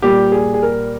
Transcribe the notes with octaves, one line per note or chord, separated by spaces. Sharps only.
A#2 G3 A#3 G4
G#4
G#4
A#4